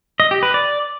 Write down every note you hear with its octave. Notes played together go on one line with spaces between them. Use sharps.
D#5
G4
B4
D5